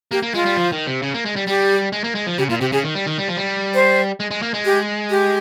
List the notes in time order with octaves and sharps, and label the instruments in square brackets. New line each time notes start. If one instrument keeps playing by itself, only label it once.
[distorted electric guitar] A#3 [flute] G4
[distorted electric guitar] A#3
[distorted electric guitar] G#3 [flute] F4
[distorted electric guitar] G3
F3
D#3
C3
C#3
A#3
G#3
G3
[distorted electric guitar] G3 [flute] G4
[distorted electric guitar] G#3
A#3
G#3
F3
[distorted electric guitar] C#3 [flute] G4
[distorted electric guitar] A#2 [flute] F4
[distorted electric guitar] C3 [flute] G4
[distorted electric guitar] C#3 [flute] G#4
[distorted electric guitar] D#3
G3
D#3
G3
F3
G3
[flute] C5
[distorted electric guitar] G#3
G#3
A#3
G#3
[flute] G4
G4